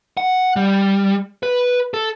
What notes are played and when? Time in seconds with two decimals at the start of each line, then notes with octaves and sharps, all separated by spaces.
0.17 F#5
0.56 G3
1.43 B4
1.94 A4